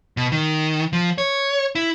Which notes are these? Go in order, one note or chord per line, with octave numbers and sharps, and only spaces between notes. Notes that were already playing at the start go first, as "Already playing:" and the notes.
B2
D#3
F3
C#5
E4